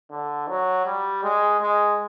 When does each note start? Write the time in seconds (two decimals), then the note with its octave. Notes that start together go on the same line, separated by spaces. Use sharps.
0.10 D3
0.48 F#3
0.86 G3
1.23 G#3
1.61 G#3